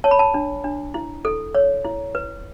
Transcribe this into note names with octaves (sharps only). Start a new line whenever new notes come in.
C#5 A5
B5
A5
D4
D4
E4
A4
C#5
E4
B4